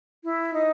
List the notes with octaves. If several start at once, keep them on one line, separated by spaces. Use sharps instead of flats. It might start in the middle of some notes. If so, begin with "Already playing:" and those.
E4
D#4